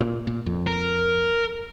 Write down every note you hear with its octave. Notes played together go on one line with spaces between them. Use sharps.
A#2
A#2
F2
A#4